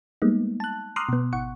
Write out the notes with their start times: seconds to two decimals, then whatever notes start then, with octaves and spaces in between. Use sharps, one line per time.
0.22 G3 G#3 A#3 B3 D#4
0.60 A5 F#6
0.96 A#5 C6 D6 D#6 F6 F#6
1.09 B2 B3
1.33 G#1 F#5 C#6